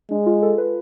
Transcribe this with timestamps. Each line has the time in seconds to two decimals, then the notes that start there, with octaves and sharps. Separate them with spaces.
0.11 G#3 D4
0.26 F4
0.42 A4
0.58 B4